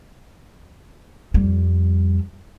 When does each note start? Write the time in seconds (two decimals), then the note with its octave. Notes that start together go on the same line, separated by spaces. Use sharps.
1.34 F2 G3